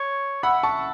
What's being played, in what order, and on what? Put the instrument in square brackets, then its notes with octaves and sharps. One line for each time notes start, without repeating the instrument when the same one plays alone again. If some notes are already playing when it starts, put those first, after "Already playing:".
Already playing: [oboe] C#5
[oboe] E5 [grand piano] F#5 B5
[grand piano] A5 C#6